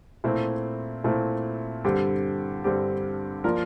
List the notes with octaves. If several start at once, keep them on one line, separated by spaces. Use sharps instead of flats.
A#2 A3 C4 E4
A#2 A3 C4 E4
G2 D3 G3 C4 G4
G2 D3 G3 C4 G4
F3 A#3 F4 A#4 D5